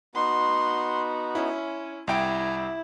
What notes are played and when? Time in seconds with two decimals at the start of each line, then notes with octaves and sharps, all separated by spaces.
0.15 B3 D#4 F#4 C6
1.35 C#4 E4
2.07 C2 E4 G5 G#5 A#5 D7